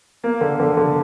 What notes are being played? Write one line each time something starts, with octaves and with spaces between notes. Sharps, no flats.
A#3
D3
D3
D3